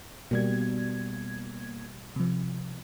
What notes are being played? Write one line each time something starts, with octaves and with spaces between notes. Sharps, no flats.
B2 G3 A#3 G#6
C3 F3